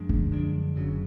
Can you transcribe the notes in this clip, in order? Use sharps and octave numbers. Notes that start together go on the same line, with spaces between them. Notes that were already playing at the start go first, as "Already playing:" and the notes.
Already playing: F#2 F3 G#3 D4
D3
F#2 F3 G#3 D4
F#1 F#2 C#3 F#3